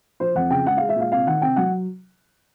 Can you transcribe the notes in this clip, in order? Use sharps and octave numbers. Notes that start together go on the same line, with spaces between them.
F3 C5
F2 F#5
C#3 G5
G#3 F#5
G#3 F5
E5
A#2 F5
C3 F5
D#3 F#5
C3 G5
F#3 F#5